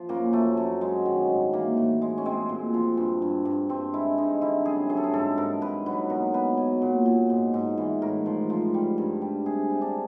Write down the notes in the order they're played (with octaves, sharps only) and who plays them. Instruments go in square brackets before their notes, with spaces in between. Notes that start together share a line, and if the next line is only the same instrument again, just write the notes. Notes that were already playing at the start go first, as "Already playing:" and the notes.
Already playing: [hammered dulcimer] F3
F#2 A#3
F#2 A3
F#2
F#3 G#3
D#3
G#2
E3 A#3
A2
G#3
C#4
G#3 C4
A#2
F3
G2
G2
G2
G2 C4
G#3 E4
G2 D#4
D3 E4
F#2 G#4
F#2 G#4
A4
G#4
G#2 A4
G#2 A#4
G#2 B4
F#3 B4
B2 A#4
B2 B4
F#3
A#2
A#2
G#2
G#2
E3
A2 A#4
F3
F3
G3
G2
G3
C3 G#4
C3
D4